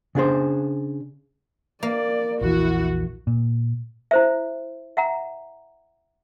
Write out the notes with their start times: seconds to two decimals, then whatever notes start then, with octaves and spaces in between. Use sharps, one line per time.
0.15 C#3 D4 G#4 C5
1.83 A#3 D5
2.41 A#1 E2 E3 E4 F#4
3.27 A#2
4.11 E4 C5 E5
4.97 E5 F#5 A#5